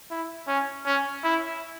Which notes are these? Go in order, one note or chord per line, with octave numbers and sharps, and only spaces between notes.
E4
C#4
C#4
E4